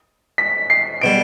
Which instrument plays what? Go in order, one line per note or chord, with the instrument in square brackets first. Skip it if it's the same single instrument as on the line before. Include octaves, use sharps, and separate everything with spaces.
[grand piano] B6
C7
[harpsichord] B2 G3 [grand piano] D7